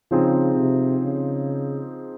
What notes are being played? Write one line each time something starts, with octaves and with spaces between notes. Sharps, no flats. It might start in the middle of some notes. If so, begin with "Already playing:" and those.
C#3 F3 C4 D#4 G#4
C3
C#3